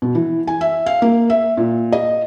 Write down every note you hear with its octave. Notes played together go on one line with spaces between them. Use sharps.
B2
E3
G#5
E5
F5
A#3
E5
A#2
D#5